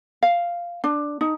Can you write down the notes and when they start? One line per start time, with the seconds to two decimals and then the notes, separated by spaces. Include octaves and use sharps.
0.23 F5
0.84 D4
1.21 D#4